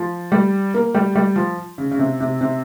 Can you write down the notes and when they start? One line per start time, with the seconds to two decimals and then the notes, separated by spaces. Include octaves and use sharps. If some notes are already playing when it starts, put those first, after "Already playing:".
Already playing: F3
0.32 G3
0.74 A#3
0.95 G3
1.16 G3
1.36 F3
1.78 C#3
1.91 C#3
1.99 C3
2.21 C3
2.41 C3